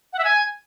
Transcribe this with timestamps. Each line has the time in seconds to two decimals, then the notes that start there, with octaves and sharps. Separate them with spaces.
0.13 F#5
0.19 E5
0.24 G#5